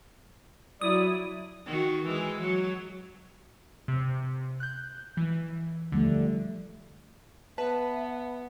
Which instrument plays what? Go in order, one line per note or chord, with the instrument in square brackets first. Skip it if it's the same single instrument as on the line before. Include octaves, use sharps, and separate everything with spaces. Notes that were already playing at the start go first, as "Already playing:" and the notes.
[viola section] F#3 E4 [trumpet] D5 [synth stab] D#6
[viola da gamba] D#3 F#4
E3 G#3
F#3
[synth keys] C3
F#6 G6
E3
[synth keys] D3 [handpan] F3 G3 A3
[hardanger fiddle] B3 [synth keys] B4 [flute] E5 [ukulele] A5